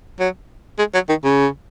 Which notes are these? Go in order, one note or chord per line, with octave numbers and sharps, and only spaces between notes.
F#3
G#3
F#3
D#3
C#3